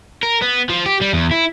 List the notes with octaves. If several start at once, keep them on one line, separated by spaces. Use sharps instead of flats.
A#4
B3
F3
G4
G3
E2
E4